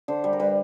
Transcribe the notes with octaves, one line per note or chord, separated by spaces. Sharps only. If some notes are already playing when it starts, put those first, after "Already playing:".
D3 C5
G3
A#4
G3 B4